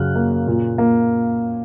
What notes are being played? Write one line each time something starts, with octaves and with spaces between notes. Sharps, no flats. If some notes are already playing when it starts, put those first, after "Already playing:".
Already playing: F#2 C#3 F#3 F6 F#6
A#3
A#2
A#3